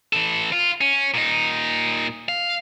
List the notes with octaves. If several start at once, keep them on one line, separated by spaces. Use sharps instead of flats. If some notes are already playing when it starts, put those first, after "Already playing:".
E3 A4
F4
C#4
A#2 D#4
F5